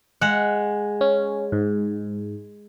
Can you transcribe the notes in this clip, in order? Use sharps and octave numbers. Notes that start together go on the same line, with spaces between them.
G#3 F#5
C#4
G#2